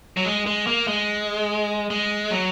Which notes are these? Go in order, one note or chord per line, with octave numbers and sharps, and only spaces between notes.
F#3
G#3
G#3
A#3
G#3
G#3
F#3